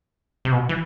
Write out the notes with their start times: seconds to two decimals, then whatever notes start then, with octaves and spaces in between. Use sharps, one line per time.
0.45 C3
0.52 B2
0.69 E3